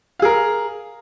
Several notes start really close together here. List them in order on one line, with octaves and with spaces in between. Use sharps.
F5 G#4 A#4